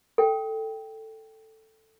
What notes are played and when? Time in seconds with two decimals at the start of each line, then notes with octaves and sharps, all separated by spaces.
0.18 A4 G5